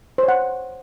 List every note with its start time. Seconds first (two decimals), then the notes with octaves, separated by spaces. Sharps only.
0.18 C5
0.23 C#5
0.28 F#5